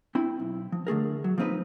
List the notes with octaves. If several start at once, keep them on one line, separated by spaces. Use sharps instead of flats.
C4 E4 B5
B1
F3
D3 A3 G#4 A#4
F#3
F3 A#3 C4 D#4 B4